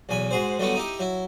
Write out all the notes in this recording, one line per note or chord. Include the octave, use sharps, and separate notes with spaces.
B1 E2 G#5 B5
G#2 F#4 G#4 C5
D3 F#3 G3 A3 B3 E4
D#4 E4 G4
F#3 E4